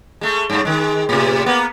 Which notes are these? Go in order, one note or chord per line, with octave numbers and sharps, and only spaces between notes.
G#3 A3
G2 A3
D#3 G#3
A2 C3
A#3 B3